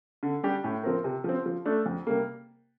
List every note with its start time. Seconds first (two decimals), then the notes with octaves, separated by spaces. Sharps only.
0.23 D3
0.43 G3 D4 G4
0.64 A2
0.83 F3 C4 F4 A#4
1.04 C3
1.24 F3 C4
1.46 F3
1.65 A3 D4 A4
1.86 F2
2.07 C3 G3 A#3